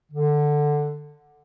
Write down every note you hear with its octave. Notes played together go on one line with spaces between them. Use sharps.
D3